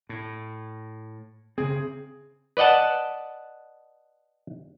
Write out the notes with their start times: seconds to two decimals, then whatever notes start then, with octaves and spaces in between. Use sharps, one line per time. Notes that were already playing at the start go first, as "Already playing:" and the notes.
0.09 A2
1.58 C#3 C4 G#4
2.57 B4 D5 D#5 F#5 A5